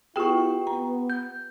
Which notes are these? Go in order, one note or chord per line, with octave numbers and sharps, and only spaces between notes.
B3 E4 F4 G4 G#4 G5 C#6
B3 A#5
G6